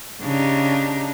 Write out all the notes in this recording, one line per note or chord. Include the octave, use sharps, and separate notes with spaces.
C#3 D4 D#4 G4